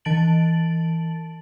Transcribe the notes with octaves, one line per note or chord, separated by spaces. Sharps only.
E3 A5 A6 D7 F#7